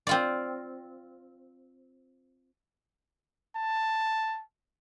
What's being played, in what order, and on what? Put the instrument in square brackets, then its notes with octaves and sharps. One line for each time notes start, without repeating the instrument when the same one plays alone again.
[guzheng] C4 F4 D5
[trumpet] A5